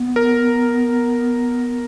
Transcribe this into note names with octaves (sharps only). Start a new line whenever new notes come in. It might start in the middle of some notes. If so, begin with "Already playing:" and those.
Already playing: B3
A#4